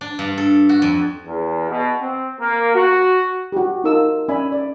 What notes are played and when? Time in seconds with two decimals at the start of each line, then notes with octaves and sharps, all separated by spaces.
0.01 D4
0.19 G2
0.38 A4
0.69 F#4
0.82 F2
1.25 E2
1.69 B2
2.00 C4
2.39 A#3
2.75 F#4
3.52 F#4 G4
3.84 D#4 F4 A#4 A5 E6
4.28 C#4 D5 E5 G#5 B5
4.52 D5